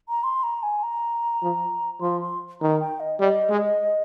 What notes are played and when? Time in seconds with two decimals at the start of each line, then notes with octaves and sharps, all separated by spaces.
0.09 A#5
0.24 C6
0.43 A#5
0.63 G#5
0.83 A#5
1.43 F3
2.01 F3 C6
2.21 C6
2.61 D#3 A#5
2.80 G5
3.00 D#5
3.20 G3 D#5
3.50 G#3